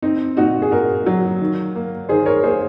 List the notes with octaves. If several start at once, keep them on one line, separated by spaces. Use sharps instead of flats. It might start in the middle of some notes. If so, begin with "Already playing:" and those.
C4 D#4
A#2 D#4 F#4
G#4
A#2 F#4 A#4
F#3
D#3
A#3
D#3 G#4 C5
A#4 C#5
A#3 G#4 C5